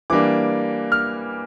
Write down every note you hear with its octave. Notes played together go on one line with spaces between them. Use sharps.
E3 G3 A#3 D4 D6
F6